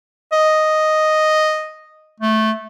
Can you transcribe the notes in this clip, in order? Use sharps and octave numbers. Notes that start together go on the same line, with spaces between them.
D#5
A3